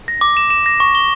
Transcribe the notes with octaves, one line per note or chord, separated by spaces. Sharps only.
A#6
D6
E7
E7
A#6
C#6
G7